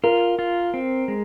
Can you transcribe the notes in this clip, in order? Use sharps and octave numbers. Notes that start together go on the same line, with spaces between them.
F4 A#4
F4
C4
G#3